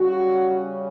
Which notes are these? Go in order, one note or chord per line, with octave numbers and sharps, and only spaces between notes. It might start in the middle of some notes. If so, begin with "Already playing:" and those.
Already playing: C#3 G3 C#4 F#4